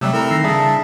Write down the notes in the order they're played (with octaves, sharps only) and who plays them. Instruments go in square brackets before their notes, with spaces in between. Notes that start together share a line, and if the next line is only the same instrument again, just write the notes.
[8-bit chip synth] C3 F#3 G3 [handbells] A3 C4 E5 [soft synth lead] E6
[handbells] E4 [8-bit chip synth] A4 A#4 A#5
[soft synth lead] D#3 [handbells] A#6 C7
[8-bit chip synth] C#3 G3 [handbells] D4 G#4 E5 [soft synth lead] A5